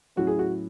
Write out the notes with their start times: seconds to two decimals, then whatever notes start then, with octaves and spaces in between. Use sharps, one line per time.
0.16 A2 F#3 C#4 E4 F#4
0.27 G#4
0.39 F#4